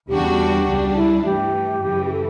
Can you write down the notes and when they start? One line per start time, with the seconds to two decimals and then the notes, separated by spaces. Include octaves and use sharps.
0.09 E2 C#3 G3 D4 F#4 G4
0.67 C#2 C#3 G3 D4
0.97 E4
1.25 G2 E3 A3 G4
1.83 F#2 C#3 E3
2.06 G4
2.12 A4